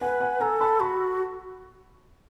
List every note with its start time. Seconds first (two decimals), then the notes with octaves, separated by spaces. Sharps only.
0.01 B4 F#5 G#5
0.20 F#5 G#5
0.40 A4 G#5 A#5
0.60 A5 B5
0.80 F#4 B5 C#6